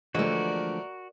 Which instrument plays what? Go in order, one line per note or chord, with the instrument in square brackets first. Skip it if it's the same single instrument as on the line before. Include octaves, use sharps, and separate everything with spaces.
[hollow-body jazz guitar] D3 E3 G#3 [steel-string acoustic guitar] F3 A3 [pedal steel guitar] F#4 [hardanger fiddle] A#4 D5